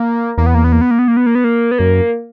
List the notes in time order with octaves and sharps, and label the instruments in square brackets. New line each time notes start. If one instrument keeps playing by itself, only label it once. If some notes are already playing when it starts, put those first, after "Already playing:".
Already playing: [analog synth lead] A#3
[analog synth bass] E2 [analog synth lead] A#3
[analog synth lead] B3
A#3
B3
A#3
B3
A#3
B3
A#3
B3
A#3
B3
A#3
B3
[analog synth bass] F#2 [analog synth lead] A#3